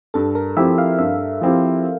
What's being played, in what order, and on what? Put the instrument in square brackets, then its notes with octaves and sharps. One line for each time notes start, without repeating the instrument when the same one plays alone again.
[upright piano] G2 [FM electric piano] A4
[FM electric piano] A#4
[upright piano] F3 C4 E4 G4 [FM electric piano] E5
[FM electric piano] F5
[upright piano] G2 [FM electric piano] E5
[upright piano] F3 C4 E4 G4